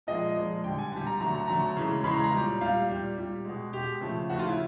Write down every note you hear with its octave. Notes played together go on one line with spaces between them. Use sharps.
A#2 F3 G#3 D#5
A#2 F3 G#3
D3 G3 G5
G#5
D3 G3 A5
A#5
D3 F#3 A3 A#5
A#5
D3 F#3 A3 A#5
C#3 E3 G#3
C#3 E3 G#3 B5
A#5
A#5
A#2 G3
A#2 G3 F5
A#2 G3
A#2 G3
B2 G#3
B2 G#3 G4
C#3 F3 A3
C#3 F3 A3 F#4
F4
E4